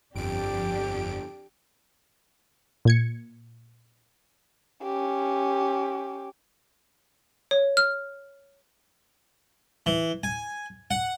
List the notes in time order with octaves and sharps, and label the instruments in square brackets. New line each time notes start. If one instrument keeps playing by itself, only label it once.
[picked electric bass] G1 [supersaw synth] F2 D7 [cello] D4 G4
[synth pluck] A#2 G#6 C#7
[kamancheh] C#4 G4
[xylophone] C#5
F6
[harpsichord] E3
G#5
F#5